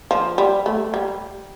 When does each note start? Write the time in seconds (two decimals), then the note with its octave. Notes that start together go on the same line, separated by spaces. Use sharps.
0.11 F3
0.38 G3
0.66 A3
0.94 G3